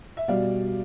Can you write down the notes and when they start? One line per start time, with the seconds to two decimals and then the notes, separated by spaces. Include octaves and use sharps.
0.17 E5
0.28 B2 G3 D5 F5